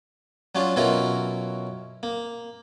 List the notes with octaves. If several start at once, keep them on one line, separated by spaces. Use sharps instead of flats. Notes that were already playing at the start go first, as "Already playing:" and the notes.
F#3 C#4 D4 F4
B2 F#3 C#4 E4 F4 A#4
A#3